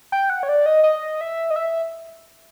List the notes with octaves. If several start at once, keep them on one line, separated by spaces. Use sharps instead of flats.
G5
F#5
C#5
D5
D#5
D#5
E5
D#5
E5